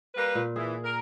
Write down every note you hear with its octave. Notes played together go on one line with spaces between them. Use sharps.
G3 A#3 B4
A#2
E3 G#4
A#4